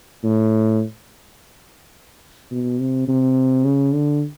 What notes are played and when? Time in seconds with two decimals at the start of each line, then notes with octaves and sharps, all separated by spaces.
0.24 A2
2.51 B2
2.80 C3
3.08 C3
3.65 C#3
3.93 D3